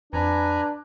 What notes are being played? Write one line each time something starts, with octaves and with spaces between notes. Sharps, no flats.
F2 D4 B4 G#5 A#5